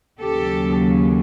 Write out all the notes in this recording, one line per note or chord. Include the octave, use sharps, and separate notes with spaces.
D#2 C#3 F#3 G4 A4